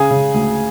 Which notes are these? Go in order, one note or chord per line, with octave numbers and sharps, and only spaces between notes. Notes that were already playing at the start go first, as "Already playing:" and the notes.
Already playing: C#3 G#4 G#5
C#3
D2